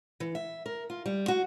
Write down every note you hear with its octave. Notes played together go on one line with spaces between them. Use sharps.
E3
E5
A#4
F4
G3
F#4